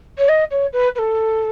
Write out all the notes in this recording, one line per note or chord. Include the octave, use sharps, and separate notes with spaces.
C#5
D#5
C#5
B4
B4
A4